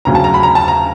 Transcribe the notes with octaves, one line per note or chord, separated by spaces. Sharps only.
E1 D2 C#3 F#3 A#5
A5
A#5
B5
A#5
A5
A#5